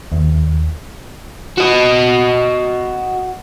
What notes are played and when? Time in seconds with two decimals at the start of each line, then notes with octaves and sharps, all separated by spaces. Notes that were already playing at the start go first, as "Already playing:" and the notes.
0.12 D#2
1.58 F#4 D#5